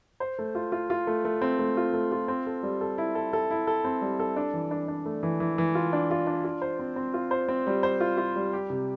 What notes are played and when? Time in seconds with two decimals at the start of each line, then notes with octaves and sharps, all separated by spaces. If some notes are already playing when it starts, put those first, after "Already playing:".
0.20 C5
0.39 A3
0.55 F4
0.72 F4
0.90 F4
1.07 A3
1.25 A3
1.42 C4
1.59 A3
1.77 F4
1.94 A3
2.12 F4
2.28 C4
2.47 A4
2.63 G3
2.81 A4
2.98 E4
3.15 A4
3.33 A4
3.51 E4
3.67 A4
3.85 C4
4.01 G3
4.20 A4
4.36 D4
4.54 E3
4.71 D4
4.88 D4
5.06 A3
5.23 E3
5.40 E3
5.58 E3
5.75 F4
5.93 D4
6.11 F4
6.27 D4
6.44 F4
6.62 C5
6.79 C4
6.96 C4
7.14 F4
7.31 C5
7.49 C4
7.67 G3
7.83 C5
8.00 F4
8.18 F4
8.36 G3
8.53 G4
8.70 C3